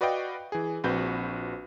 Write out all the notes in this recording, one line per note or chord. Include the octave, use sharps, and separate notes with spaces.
F#4 B4 D5 D#5 F5 G5
E3 G#4
A#1 C4 F#4 B4 G6